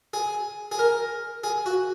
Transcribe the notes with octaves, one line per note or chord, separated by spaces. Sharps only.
G#4
G#4
A#4
G#4
F#4